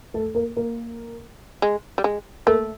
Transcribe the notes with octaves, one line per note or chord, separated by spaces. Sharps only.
A3 A4
A#3 A#4
A#3 A#4
G#3
G3
G#3
A3 A#3 A#4